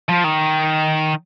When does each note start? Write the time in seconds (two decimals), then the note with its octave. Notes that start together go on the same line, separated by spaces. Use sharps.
0.09 F3
0.24 D#3